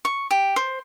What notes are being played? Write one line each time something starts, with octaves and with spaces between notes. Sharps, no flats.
C#6
G4
C5